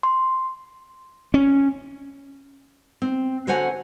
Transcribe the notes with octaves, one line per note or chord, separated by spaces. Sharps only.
C6
C#4
C4
D3 F#4 C5 C#5 F#5 G#5